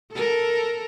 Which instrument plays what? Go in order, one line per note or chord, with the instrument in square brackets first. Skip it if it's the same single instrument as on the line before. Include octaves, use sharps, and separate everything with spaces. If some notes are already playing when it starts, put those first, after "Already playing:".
[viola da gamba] A4 A#4